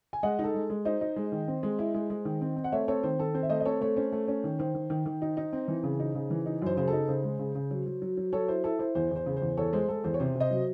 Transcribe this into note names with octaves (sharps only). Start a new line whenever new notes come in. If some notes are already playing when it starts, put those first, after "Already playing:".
G#5
G#3 D#5 F#5
D#4
A4
G#3
G#3
D#4 C5 D#5
D#4
G#3
D#3
C4
G#3
E4
G#3
G#3
D#3
C4
C4
F#5
A3 C#5 E5
C4 A4 C#5
D#3 C5
D#3 A4
C4 C5
E5
A3 C5 D#5
D#5
C4 A4 C#5
A3 A4 C#5
C#4 C5
A3
C#4
D#3
D#3 C5
D#3
D#3
D#3
D#4
D#4
C4
E3
C#3
D#4
C#3
E3
D#4
F#2 C5
C#3 C5
A4
D#4
C#3 C5
G#3
C#3
C#3
F#3
F#3
F#3
F#3
F#3 A4 C#5
E4 C5
E4 A4
E4 C5
E2 C5
E2 C5
C#3
C5
E2
E2 A4 C#5
G#3 C5
G#3 A4
E2 C5
C#5
C3 C5
C3
C5 D#5
F#3